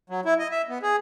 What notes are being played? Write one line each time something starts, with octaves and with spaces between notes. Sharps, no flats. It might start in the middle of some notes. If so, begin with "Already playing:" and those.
F#3
E4
D#5
E5
B3
G#4